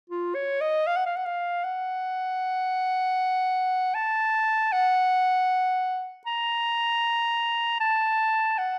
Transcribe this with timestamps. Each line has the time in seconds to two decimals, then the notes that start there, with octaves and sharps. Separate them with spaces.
0.10 F4
0.35 C#5
0.61 D#5
0.87 F5
0.97 F#5
1.06 F5
1.16 F#5
1.25 F5
1.64 F#5
3.95 A5
4.72 F#5
6.26 A#5
7.81 A5
8.58 F#5